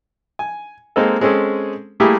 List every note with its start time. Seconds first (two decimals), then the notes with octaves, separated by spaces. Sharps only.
0.39 G#5
0.96 G#3 A#3 C4 D#4 A4
1.21 G#3 C4 C#4 G#4 A4
2.00 G3 A3 A#3 E4 G4 G#4